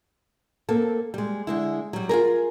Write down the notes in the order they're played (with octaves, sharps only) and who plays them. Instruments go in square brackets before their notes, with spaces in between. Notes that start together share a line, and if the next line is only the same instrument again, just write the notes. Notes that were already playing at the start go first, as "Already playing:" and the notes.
[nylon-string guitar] A#3 C4 A4
G3 G#3
D3 G#3 E4
F#3 G3
F4 G#4 A#4